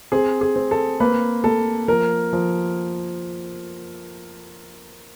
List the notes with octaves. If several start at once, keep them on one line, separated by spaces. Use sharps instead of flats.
C4 G#4
G#4
C4
A4
A#3 B4
A#3 A4
F3 A#4
F3